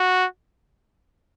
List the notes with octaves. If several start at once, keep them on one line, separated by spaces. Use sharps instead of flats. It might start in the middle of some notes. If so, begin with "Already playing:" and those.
Already playing: F#4